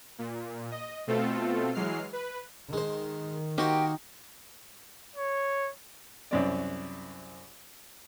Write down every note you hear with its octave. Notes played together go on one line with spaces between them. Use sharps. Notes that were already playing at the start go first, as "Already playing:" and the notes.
A#2
D#5
B2 A3 C4 F4 A4
E3 F#3 G#3 F6 C7
B4
D#3 G#3 C5
A#3 D#4 F#4 G4 C5
C#5
C2 F#2 D5